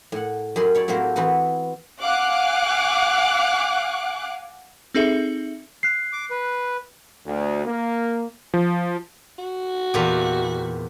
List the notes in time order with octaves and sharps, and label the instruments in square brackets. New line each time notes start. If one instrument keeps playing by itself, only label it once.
[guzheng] A2 F#5
F#2 G4 G#4 B5 C6
E4 C#5 D5
A2 F#3 A#3 C4 G4 C5
E3 B3 C4 F#4 B4
[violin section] F5 F#5 G#5 D6 F#6
[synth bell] C4 D#4 G#4 A4 E5
[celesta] F#6 C7
[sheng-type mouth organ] D6
B4
[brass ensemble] D2
A#3
[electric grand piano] F3
[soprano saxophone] F#4
[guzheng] E2 A#2 G4